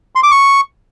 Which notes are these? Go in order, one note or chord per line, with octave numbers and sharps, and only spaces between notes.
C6
D6
C#6